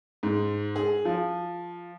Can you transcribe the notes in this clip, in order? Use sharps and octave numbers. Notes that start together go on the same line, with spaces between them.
G#2
G#4
F3